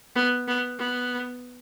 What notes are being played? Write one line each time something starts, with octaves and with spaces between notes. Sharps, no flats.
B3
B3
B3